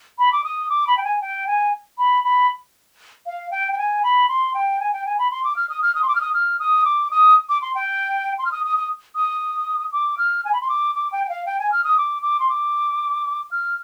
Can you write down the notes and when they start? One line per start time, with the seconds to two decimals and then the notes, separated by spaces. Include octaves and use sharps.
0.19 B5
0.32 D6
0.44 D#6
0.70 D6
0.87 B5
0.97 G5
1.04 G#5
1.21 G5
1.47 G#5
1.98 B5
2.24 B5
3.26 F5
3.51 G5
3.72 G5
3.78 G#5
4.03 B5
4.29 C6
4.54 G5
4.80 G#5
4.93 G5
5.06 G#5
5.19 B5
5.31 C6
5.44 D6
5.56 F6
5.69 D#6
5.82 F6
5.95 D#6
6.03 C6
6.08 D6
6.15 F6
6.21 D#6
6.34 F6
6.59 D#6
6.85 D6
7.11 D#6
7.49 D6
7.62 C6
7.75 G5
8.39 C6
8.45 F6
8.52 D#6
8.65 D#6
8.77 D#6
9.15 D#6
9.92 D6
10.18 F6
10.45 G#5
10.53 B5
10.61 C6
10.69 D6
10.95 D6
11.12 G5
11.25 G5
11.29 F5
11.46 G5
11.59 G#5
11.72 F6
11.84 D#6
11.98 D6
12.23 D6
12.40 C6
12.49 D6
13.51 F6